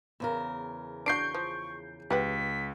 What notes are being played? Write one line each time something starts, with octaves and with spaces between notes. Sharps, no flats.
E2 C#3 A#4
D4 F#4 C#6 G6 C7 D7
F3
C#2 G4 B4 F#5 B6